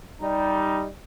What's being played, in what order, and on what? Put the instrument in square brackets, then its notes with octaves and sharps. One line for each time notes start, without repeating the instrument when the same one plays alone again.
[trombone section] G3 D#4